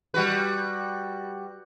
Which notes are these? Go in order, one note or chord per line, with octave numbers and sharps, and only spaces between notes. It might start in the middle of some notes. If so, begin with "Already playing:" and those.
G3 F#4 B4